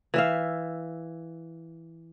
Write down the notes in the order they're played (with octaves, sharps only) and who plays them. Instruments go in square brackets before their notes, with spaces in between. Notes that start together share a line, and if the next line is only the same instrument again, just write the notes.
[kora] E3 E5 F5